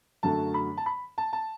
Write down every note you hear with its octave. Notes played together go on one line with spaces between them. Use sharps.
F#2 D3 F#3 A3 A5
B5
A5
B5
A5
A5